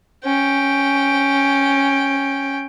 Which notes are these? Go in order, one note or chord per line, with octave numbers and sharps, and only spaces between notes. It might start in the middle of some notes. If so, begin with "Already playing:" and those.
C#4 G5